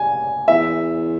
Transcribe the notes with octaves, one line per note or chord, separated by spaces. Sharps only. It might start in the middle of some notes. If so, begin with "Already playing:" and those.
Already playing: G#5
E2 E5